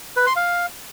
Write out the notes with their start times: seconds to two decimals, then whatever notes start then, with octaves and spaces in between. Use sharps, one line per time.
0.17 B4
0.26 C6
0.36 F5